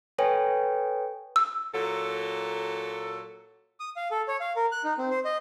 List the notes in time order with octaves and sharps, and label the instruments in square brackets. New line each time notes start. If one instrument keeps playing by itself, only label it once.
[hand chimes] A4 B4 C#5 G5 G#5
[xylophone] E6
[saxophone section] A#2 F#3 A4
[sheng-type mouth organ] D#6
F5
A4
C#5
F5
A#4
F#6
D#4
C4
C5
D#5